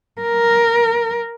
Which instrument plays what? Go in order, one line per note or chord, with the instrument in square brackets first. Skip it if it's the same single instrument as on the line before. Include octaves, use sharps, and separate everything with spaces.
[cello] A#4